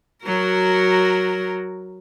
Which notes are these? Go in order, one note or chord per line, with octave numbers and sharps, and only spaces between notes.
F#3 F#4 A#4